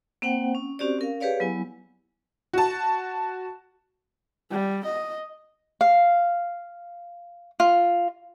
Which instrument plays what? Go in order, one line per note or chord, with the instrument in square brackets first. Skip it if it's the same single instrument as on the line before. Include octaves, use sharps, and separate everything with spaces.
[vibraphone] A#3 C4 C5 F#5 G5
C#4
C4 C#4 F#4 G4 C5 D5
C#4 A#4 F5
G4 G#4 B4 C#5 D5 F5
F#3 B3 E4 G#5
[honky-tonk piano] F#4 A5
[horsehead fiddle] G3
D#5
[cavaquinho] F5
F4